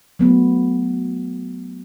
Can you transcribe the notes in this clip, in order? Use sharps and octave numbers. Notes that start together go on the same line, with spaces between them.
F#3 A3 B3